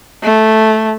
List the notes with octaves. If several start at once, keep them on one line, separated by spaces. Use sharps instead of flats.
A3